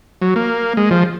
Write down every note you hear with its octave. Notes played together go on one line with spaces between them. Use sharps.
F#3
A#3
G#3
F3